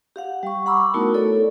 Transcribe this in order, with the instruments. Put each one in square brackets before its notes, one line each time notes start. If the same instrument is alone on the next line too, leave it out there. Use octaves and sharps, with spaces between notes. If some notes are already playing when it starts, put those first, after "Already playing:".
[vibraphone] G4 F5 F#5
G3 C#6
F#5 A#5 B5 C#6 D6 E6
A3 B3 D#4 E4 F#4 A#4
B3 E4 A4 C#5 D5